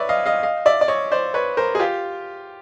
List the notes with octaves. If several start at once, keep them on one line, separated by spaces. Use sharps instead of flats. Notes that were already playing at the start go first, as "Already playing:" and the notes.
Already playing: B4 C#5 D5 E5
D#5 F5
D#5 F5
D#5 F5
D5 E5
D5
C#5 D#5
C5 D5
B4 C#5
A#4 C5
G#4
F4 G4